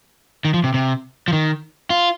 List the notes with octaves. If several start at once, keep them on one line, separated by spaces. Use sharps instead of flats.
D#3
F3
C3
C3
F3
D#3
F4